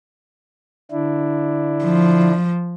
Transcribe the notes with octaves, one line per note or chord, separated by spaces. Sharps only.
D3 D4 E4
F3